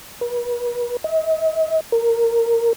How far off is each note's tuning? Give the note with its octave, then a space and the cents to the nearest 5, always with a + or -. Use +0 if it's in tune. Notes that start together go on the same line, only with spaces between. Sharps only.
B4 -40
D#5 +45
A#4 -10